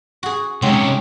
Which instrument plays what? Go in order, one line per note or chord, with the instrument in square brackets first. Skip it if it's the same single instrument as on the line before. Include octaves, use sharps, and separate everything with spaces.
[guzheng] F#4 G#4
[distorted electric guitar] C3 C#4 [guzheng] F#3 C4 D#4 [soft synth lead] G#3